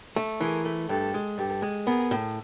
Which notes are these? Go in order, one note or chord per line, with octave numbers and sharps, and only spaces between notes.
A3
E3 G#4 A#4
A3
G2 G4 A4
G#3
G2 G4 A4
G#3
B3 G#4 A#4
A2